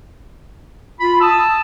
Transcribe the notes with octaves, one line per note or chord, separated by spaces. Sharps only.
F4 B5
A5 D#6 E6